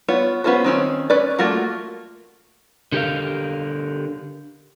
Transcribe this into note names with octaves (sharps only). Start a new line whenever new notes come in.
B3 F4 C#5
B3 C#4 F4 A4 C5
D#3 C4 C#4
C#4 B4 D5
A3 A#3 F4 F#4 A#4
D3 G4 A#4 F5